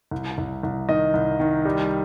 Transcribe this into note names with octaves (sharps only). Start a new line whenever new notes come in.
C2
C2
C2
D#3 D#5
C2
D#3
G3